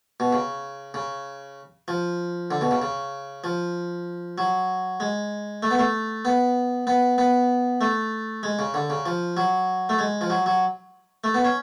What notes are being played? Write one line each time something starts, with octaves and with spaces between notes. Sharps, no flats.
B2
C#3
C#3
F3
D3
B2
C#3
C#3
F3
F#3
G#3
A3
B3
A3
B3
B3
B3
A3
G#3
C#3
D3
C#3
F3
F#3
A3
G#3
F3
F#3
F#3
A3
B3
C#4